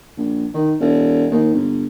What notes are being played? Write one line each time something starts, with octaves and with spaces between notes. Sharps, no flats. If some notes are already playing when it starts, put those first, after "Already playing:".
A#1
D#3
E1
D#2
G1